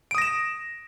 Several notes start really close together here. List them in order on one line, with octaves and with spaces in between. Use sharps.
D7 D#6 A#6 E7